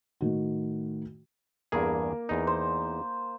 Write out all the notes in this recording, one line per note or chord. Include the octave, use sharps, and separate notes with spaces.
A2 D#3 F#4
E2 G2 A#3 G#4
E2 D#4
C5